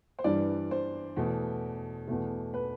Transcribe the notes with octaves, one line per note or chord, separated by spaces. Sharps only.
C5
G2 E3 G3 D5
C5
E2 B2 A3
E2 B2 A3
B4